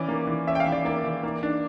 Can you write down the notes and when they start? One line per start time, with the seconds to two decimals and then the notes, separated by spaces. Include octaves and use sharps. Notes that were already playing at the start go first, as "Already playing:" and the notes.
Already playing: E3 C#4 D5
0.08 A#3
0.27 E3
0.47 C#4 E5
0.55 G5
0.60 F5
0.67 E3
0.72 D5
0.85 A#3 D5
1.04 E3
1.23 A#3
1.43 D4